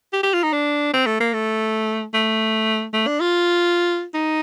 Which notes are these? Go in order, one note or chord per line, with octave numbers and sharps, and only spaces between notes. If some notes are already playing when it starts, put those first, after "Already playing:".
G4
G4
F4
D#4
D4
C4
A3
A#3
A3
A3
A3
D4
F4
D#4